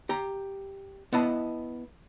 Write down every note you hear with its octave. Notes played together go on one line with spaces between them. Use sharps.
G4 A#5
B3 E4 D#5 A5